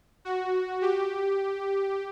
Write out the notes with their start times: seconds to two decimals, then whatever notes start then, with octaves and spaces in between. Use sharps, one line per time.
0.25 F#4
0.82 G4